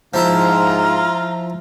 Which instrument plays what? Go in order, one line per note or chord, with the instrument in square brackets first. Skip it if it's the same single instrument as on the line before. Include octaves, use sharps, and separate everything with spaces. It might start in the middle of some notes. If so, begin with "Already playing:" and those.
[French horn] G#2 [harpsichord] F3 E4 [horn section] F4 [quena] A#5